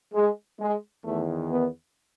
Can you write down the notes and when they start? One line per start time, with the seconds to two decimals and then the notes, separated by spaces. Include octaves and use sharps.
0.13 G#3
0.59 G#3
1.04 E2 D#3 A3
1.50 B3